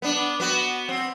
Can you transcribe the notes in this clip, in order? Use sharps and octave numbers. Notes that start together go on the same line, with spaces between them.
B3 D4
B3 F#4
C4